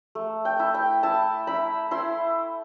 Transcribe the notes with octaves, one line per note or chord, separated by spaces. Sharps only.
A3
G5
E4
G5
E4 A5
E4 B5
E4 C6